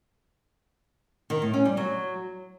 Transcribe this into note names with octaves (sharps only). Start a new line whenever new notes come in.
D#3
A2
C#4
G3
F#3